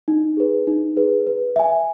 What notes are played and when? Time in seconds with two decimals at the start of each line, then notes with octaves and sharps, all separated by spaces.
0.08 D#4
0.37 G#4 B4
0.67 D#4
0.96 G#4 B4
1.27 B4
1.56 E5 G#5